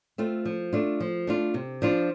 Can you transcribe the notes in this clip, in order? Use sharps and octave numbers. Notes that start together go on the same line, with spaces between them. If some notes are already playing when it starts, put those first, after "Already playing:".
A3 C4 F4
F3
A3 D4 F4
F3
A3 D4 F4
C3
F3 D4 F4